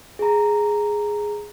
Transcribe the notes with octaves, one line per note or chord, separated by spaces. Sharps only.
G#4 A#5